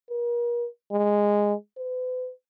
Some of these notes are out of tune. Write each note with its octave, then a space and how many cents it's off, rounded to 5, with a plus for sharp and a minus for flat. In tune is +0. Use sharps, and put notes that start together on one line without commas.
A#4 +40
G#3 -10
B4 +40